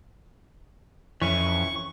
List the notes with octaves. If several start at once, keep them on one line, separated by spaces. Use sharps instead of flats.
F2 E3 C#4 E4 C#6